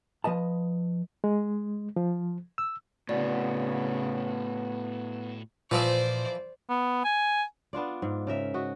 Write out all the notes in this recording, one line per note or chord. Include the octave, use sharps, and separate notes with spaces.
F3 B4 D#5 A5
G#3
F3
E6
A2 C#3 B3 F#4 D5
A#2 E3 F3 C5 D5 E5
B3
G#5
B3 D4 F4 D5
G#2
C#3 A#4 E5
F#4 D#5